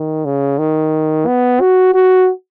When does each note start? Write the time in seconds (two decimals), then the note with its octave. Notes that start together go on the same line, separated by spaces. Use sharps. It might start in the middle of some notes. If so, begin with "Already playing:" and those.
Already playing: D#3
0.25 C#3
0.59 D#3
1.27 B3
1.60 F#4
1.94 F#4